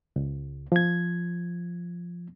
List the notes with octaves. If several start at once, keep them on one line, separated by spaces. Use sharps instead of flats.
C#2
F3 G#6